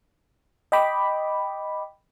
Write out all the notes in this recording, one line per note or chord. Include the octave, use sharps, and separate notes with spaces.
D#5 G5 B5 D6